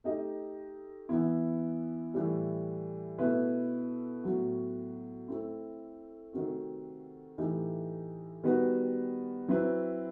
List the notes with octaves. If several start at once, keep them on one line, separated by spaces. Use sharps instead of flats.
A3 D#4 G4 D#5
E3 B3 E4
A2 E3 G3
B2 A3 E4 B4 E5
A2 F#3 B3 F#4
A3 C4 E4
C3 D#3 A3 C4 F#4
A2 E3 A3 D#4 G4
D#3 G3 B3 F#4 B4
F#3 C4 E4 B4